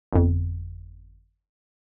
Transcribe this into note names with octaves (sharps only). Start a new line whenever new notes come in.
G1 F2